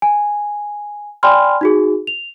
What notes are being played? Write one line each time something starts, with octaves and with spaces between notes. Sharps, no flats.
G#5
D5 G5 G#5 B5 C6 F6
D#4 F#4 G#4
F7